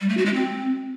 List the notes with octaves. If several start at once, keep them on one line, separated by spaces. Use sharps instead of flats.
G3
A3
F#4
G#3
C4